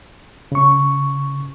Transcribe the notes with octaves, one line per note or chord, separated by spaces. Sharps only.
C#3 C#6